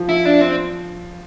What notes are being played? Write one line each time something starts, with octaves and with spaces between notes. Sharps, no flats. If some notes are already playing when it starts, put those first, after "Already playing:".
Already playing: F3
E4
D4
C4